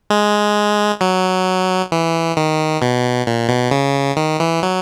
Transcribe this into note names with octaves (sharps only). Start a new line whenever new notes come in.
G#3
F#3
E3
D#3
B2
A#2
B2
C#3
D#3
E3
F#3